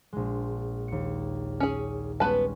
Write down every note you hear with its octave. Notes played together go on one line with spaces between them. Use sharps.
A#1 G#3
D#2 C#7
C#4 G#4
G3 G#3 B3 C#4 B4 A5